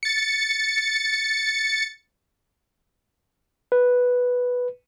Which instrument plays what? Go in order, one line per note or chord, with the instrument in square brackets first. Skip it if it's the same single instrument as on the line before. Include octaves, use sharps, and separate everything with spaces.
[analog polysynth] A6 C#7
[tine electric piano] B4